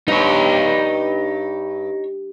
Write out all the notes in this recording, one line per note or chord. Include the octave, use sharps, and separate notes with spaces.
G2 D#4 C#5